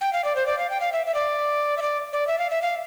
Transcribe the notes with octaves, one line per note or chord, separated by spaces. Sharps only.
G5
F5
D5
C5
D5
F5
G5
F5
E5
E5
D5
E5
D5
D5
E5
F5
E5
F5